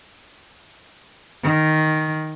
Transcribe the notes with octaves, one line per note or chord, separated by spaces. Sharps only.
D#3